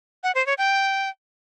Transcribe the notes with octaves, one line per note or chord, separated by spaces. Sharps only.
F#5
C5
C#5
G5